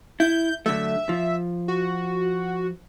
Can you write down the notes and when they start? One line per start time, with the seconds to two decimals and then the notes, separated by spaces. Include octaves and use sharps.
0.20 E4 G6
0.66 D3 F#3 A3 E5
1.09 F3
1.68 F#4